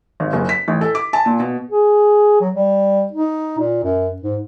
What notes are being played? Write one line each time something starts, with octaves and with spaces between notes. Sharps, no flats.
G#1
F#1
B6
A1
A4
D6
A5
A#2
B2
G#4
F#3
G3
D#4
A#2
F#2
G#2